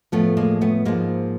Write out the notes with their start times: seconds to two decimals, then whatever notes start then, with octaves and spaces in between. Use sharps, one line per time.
0.12 A2 F3 A3 B3
0.37 G#3 A#3
0.61 A3 B3
0.85 G#2 F3 G#3 A#3